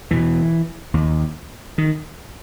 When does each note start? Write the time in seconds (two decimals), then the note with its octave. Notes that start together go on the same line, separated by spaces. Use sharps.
0.11 E2 B2 E3
0.94 D#2
1.78 D#3